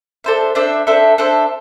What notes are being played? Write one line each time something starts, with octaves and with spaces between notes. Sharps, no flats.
D4 A4 C5 E5
D4 A4 C5 E5
D4 A4 C5 E5
D4 A4 C5 E5